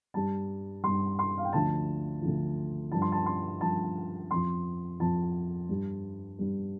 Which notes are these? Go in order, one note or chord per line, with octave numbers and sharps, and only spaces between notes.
G2 G3 A5
G2 G3 C6
C6
F5
G5
D2 D3 F3 A5
D2 D3 F3
G2 F3 A5
C6
A5
C6
G2 F3 A5
F2 F3 C6
F2 F3 A5
G2 G3
G2 G3